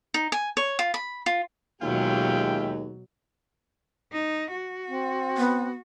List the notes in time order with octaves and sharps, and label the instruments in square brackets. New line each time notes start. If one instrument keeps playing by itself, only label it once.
[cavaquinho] D#4
G#5
C#5
F4
B5
F4
[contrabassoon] D#2 [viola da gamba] B2 F#3 [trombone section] G#3 G4 [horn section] F4 E5 G5
[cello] D#4
F#4
[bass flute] C4
[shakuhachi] B3